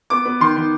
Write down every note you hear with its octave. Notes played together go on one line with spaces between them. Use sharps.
B3 D6
B3
D#3 C6
D#3